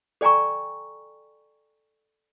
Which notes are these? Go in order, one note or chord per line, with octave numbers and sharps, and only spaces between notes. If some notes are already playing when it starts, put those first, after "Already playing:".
A4 D5 G5 G#5 A#5 C#6